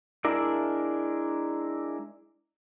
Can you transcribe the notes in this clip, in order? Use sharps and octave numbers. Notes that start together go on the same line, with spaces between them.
G#3 D4 E4 A#4 D5